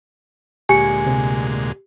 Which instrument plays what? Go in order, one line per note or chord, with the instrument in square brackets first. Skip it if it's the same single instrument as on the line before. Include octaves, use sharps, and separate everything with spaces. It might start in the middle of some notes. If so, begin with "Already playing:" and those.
[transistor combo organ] D2 A#2 G#3 [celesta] G4 C#7 [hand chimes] G#5
[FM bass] C3